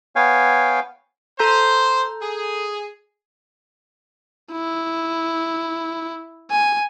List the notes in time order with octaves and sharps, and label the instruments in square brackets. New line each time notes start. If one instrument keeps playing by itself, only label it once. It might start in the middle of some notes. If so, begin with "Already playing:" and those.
[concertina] B3 C#5 F5 G5 G#5
[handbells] A4 A#5 G6 [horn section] C5
[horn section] G#4
[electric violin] E4
G#5